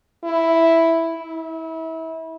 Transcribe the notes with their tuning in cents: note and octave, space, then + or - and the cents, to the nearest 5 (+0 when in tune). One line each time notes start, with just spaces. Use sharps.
E4 +0
E4 -30